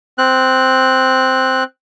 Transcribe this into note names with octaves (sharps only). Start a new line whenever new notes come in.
C4 F#6